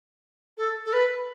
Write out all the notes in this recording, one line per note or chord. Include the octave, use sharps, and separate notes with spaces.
A4
A4
B4